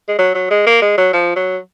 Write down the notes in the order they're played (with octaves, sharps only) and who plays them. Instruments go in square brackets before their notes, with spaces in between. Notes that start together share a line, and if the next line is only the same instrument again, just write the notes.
[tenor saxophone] G#3
F#3
F#3
G#3
A#3
G#3
F#3
F3
F#3